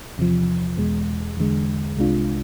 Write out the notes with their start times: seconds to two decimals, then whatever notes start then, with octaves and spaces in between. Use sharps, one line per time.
0.18 E2 C3 F3
0.78 E2 B2 G#3
1.37 E2 D3 G#3
1.97 C2 C3 G#3 D4 F4